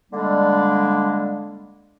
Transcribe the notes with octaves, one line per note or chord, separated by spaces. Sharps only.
D3 G3 G#3 A#3 D4